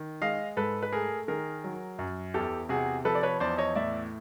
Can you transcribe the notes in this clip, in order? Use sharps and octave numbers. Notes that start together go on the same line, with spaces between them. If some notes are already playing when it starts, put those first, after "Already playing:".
Already playing: D#3
G#3 D#5 F5
G#2 A4 B4
B4
A3 G#4 A#4
D#3 G#4 A#4
F#3
F#2
E2 G4 A4
C3 F#4 G#4
F3 A4 B4
D5
B4 C#5
E2 C5 D5
C#5 D#5
A2 D5 E5